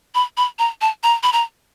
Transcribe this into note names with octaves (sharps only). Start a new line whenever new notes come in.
B5
B5
A#5
A5
A#5
B5
A#5